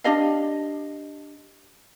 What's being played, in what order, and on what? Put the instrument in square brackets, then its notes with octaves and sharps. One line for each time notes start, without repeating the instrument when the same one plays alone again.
[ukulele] D4 G4 D#5 F5